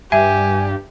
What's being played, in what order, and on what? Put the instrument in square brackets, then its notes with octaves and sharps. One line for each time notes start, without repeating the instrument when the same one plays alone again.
[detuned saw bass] G2 [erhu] G4 [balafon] E5 [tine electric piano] G#5